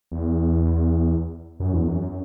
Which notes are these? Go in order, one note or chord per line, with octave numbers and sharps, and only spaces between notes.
E2
F#2
E2
F#2